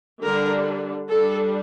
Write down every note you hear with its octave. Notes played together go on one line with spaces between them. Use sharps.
D3 G3 D4 A#4
G3 D4 A4